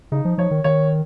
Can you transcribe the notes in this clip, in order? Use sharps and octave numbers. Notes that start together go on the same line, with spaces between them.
C#3 D#4
F3
F3 C#5
D#3
D#3 C#5